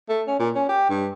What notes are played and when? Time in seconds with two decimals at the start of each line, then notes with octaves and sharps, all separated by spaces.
0.09 A3
0.27 C#4
0.39 A#2
0.55 C#4
0.69 G4
0.89 G2